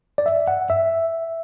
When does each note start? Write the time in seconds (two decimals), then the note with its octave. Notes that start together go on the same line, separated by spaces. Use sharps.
0.18 D5
0.26 E5
0.48 F#5
0.70 E5